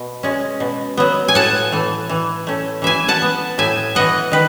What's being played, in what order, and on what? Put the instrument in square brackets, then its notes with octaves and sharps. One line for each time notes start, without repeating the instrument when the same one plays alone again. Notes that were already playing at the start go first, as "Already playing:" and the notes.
Already playing: [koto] B2
G#3 C#4
B2
F#3 B3
G#5
A2 F#5 A5
E3 A3
E3
A3 C#4
E3 E5 G#5
F#5 A5
B3
A2 E5 G#5
E3 B3 D#5 F#5
D#3 B4